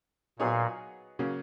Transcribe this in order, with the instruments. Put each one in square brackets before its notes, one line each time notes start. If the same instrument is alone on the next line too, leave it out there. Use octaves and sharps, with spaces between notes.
[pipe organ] A#2 [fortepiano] F#3 B3 D#4 G#4 C#5
[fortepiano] C#3 F#3 A#3 C#4